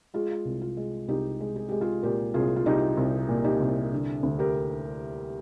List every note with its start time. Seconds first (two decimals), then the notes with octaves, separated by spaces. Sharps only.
0.14 G#3 F4 G#4
0.45 C2
0.62 F4
0.77 G#3
1.08 C2 D#4 G4
1.40 G#3
1.56 G#4
1.69 G#3 G4
1.81 F4 G#4
2.03 A#2 G4 A#4
2.34 C2 F4 G#4
2.56 F4
2.66 C2 D#4 G4
2.97 C2
3.29 A#2
3.44 D#4 G4
3.60 C2
3.92 D3
4.23 D2
4.39 G4 A#4